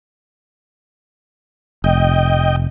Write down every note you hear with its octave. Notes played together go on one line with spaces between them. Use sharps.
F1 D#5 G5